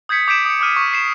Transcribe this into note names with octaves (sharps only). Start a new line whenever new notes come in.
D#6 G6 G#6 B6 C#7
D6 G6 B6 D7 E7
D#6 C#7
D6 D#6 F6 D#7
C#6
C7 E7